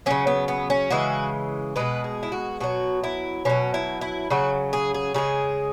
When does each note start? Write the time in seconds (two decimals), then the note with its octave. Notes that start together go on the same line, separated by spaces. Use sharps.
0.06 C#3 F#3 C#4
0.27 B3
0.48 B3
0.70 C#4
0.90 C#3 E3 G#3 F#4
1.76 B2 G#3 B4
2.04 G#4
2.23 E4
2.32 F#4
2.60 B2 F#3 F#4
3.04 E4
3.45 B2 F#3 C#4
3.74 E4
4.01 E4
4.30 C#3 F#3 F#4
4.73 G#4
4.94 G#4
5.14 C#3 G#3 G#4